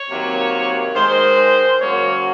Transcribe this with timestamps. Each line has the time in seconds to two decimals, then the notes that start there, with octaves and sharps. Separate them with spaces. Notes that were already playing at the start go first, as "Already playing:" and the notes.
Already playing: C#5
0.09 C3 D#3 F#3 A#3
0.94 D#3 G#3 C5
1.78 C#3 F#3 A#3 C#5